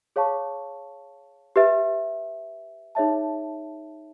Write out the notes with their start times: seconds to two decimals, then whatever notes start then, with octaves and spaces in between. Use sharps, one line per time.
0.16 G#4 C#5 F5 A5 C#6
1.56 G4 B4 E5
2.95 D#4 G#4 C#5 E5 A5